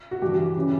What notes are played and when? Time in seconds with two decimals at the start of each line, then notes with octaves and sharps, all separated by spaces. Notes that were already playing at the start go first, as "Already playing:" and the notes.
0.11 F#4
0.22 G2 E3 G4
0.57 C#3 E3